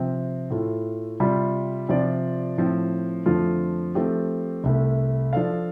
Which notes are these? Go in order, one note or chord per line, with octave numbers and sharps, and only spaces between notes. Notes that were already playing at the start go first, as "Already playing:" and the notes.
Already playing: C3 F3 C4
A2 A3 F4
C3 G3 F4
C3 F3 C4 F4 D5
A2 F3 C4
F2 D3 F3 A3 F4
F3 A3 C4 G4
C2 C3 A3
F3 D4 A4 F5